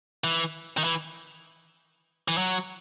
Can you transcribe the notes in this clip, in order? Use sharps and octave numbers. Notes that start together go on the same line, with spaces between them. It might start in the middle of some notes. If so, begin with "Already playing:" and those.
E3
D#3
E3
E3
F#3